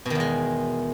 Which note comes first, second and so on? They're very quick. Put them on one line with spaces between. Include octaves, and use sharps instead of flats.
B2 D#3 E2 G#3